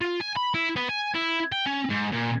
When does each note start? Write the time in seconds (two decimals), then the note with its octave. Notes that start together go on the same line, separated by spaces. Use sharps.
0.01 F4
0.21 G#5
0.37 B5
0.54 E4
0.76 B3
0.89 G#5
1.14 E4
1.52 G5
1.66 C#4
1.90 G#2
2.13 A#2